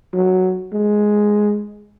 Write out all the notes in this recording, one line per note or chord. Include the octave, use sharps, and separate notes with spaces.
F#3
G#3